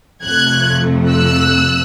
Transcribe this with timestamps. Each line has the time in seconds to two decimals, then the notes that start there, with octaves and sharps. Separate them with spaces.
0.23 F2 C3 F3 A3 F#6 G#6
1.10 E6 F#6